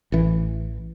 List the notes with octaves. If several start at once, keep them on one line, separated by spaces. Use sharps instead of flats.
A1 E3